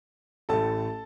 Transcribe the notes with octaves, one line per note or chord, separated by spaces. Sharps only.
A1 A2 A3 A4 A5